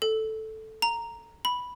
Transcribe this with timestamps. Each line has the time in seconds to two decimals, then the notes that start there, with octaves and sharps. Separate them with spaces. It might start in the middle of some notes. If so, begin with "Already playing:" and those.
0.02 A4
0.82 A#5
1.45 B5